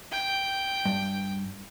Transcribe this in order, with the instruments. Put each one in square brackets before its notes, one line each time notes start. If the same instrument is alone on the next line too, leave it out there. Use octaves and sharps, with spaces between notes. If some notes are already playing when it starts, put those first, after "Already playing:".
[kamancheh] G5
[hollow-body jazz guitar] G2